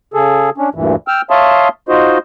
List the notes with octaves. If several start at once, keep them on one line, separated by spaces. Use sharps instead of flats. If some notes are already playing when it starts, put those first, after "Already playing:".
C#3 G#4 A4
C#4 D4
D2 G2 A#2 E3
G5 E6 F6
C#5 E5 F5 A5 C6 D#6
D#4 F4 F#4 C5 D#5